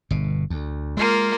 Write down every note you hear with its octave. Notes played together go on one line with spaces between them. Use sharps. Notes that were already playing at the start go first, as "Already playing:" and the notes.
G1 B2
D2
G#3 A#3 F4